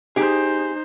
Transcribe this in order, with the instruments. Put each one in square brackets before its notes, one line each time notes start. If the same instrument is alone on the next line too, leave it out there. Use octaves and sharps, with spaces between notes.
[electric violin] D#4 C5 [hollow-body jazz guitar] G4 G#4